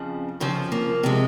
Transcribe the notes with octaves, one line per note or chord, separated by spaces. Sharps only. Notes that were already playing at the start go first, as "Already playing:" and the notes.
Already playing: F2 C#3 F3
F2 C#3 F3 C4
A#3
C3 F3 G#3